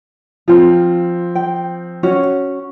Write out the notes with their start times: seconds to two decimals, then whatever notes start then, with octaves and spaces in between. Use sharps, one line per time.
0.48 F3 C4 F4
1.35 G5
2.03 C#4 F#4 C#5